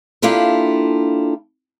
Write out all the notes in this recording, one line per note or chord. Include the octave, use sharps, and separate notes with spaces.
A#3 D4 E4 F4 G4 A4